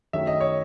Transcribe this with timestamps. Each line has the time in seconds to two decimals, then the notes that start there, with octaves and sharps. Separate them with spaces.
0.13 F#2 D#3 F#3 A3 E5
0.27 D#5
0.41 C#5